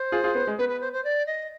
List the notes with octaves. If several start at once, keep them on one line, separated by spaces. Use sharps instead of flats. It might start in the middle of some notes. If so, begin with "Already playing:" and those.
Already playing: C5
F4 G#4
F4 G#4
B3
G#3
B3 B4
B4
C5
C5
D5
D#5